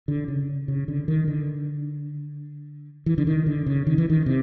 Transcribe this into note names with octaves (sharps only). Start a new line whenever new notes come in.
D3
C#3
C#3
D3
D#3
D3
E3
D3
D#3
D3
C#3
D#3
E3
D#3
C3